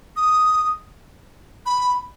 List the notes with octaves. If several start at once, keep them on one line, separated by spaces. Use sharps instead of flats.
D#6
B5